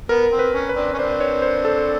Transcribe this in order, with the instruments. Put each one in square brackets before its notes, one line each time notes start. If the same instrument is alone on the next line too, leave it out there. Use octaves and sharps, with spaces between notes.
[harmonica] B3 [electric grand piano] A#4
[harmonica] C4
[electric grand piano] B4
[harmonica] C#4
[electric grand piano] B4
[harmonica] C4 D4
C#4
[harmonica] C4 D4 [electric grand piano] C5
[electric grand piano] C#5
C5
A4